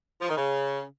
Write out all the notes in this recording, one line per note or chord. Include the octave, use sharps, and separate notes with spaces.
F3
D#3
C#3